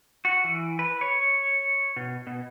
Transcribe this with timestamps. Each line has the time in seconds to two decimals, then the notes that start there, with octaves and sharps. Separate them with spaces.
0.25 F#4
0.44 E3
0.79 B4
1.01 C#5
1.96 B2
2.27 B2